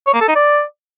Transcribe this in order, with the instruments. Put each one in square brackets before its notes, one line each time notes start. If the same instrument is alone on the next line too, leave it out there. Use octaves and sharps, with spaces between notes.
[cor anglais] C#5
A#3
A4
D#4
D5